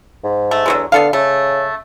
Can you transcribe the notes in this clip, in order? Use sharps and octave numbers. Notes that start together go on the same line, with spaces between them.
G#2
A3
E2 D3 F#3 G#3
D3 B3 A4 F5
C#3 A3